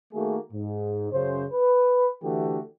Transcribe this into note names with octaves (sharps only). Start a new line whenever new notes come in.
D#3 A3 A#3 F#4 G#4
G#2
F#2 C#3 C5
B4
D3 E3 A3 F#4 G4